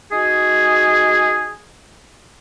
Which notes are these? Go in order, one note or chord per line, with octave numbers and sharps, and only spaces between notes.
D#4 F#4 G#4